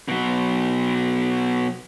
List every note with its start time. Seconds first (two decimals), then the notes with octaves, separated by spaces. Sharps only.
0.08 B2 F#3